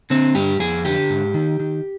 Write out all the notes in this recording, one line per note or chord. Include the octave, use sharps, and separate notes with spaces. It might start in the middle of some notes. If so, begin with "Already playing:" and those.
D3 C4
G2 G4
F2 G#4
D3 G4
G#2
D#3
D#3